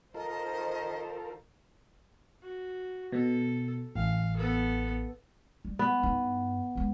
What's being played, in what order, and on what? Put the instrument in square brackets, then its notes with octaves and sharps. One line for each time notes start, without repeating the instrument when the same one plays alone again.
[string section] D#3 C5 [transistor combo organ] F4 A4 A#4 [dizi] D#5 [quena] A#5
[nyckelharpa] F#4
[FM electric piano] B2 [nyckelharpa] A4
[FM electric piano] A1 [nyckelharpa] F5
[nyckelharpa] B3 A4
[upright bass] G3
[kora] B3
[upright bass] G2 D#4
D#2 G#3